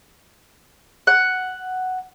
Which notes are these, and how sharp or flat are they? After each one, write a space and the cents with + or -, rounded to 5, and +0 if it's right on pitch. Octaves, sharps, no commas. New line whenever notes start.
F#5 +5